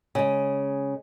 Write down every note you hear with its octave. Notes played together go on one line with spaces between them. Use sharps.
C#3 G#3